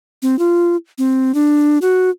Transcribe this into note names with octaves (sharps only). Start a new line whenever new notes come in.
C4
F4
C4
D4
F#4